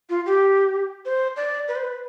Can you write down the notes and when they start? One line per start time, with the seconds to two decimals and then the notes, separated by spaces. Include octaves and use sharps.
0.10 F4
0.26 G4
1.05 C5
1.37 D5
1.68 B4
1.76 C5
1.84 B4